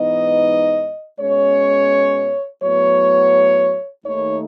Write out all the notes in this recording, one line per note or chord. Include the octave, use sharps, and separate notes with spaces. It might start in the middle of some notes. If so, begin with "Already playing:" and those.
Already playing: G#2 E3 B3 D#4 D#5
B2 G#3 C#4 C#5
A2 F#3 B3 C#5
D#2 D#3 A3 D#4 C#5